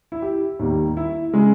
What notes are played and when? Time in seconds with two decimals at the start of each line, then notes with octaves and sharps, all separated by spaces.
0.12 E4
0.22 G4
0.59 D#2 D#3 G3 A#3
0.97 E4
1.33 C#3 G#3